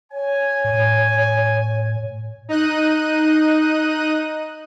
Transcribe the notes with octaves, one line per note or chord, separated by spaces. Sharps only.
C#5 G#5
A2
D#4 D#5 F#6 D#7